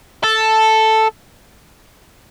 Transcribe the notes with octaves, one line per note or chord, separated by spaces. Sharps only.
A4